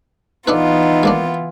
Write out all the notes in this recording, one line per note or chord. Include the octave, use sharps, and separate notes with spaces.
E3 B3 D4 D#4 F4 A4 B4
G#3 A#3 D4